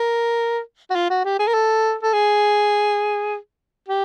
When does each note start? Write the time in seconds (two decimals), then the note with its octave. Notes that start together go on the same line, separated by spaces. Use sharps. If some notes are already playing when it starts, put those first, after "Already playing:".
Already playing: A#4
0.91 F#4
0.95 F4
1.10 F#4
1.25 G4
1.39 G#4
1.48 A#4
1.54 A4
2.03 A4
2.13 G#4
3.89 G4